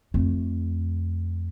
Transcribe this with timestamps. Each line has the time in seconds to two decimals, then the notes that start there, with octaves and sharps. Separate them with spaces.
0.14 F2 A3